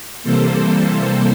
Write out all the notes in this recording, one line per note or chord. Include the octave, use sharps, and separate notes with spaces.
C3 E3 G3 A#3 A4 C5